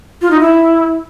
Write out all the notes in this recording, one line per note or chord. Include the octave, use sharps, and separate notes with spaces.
F4
D#4
E4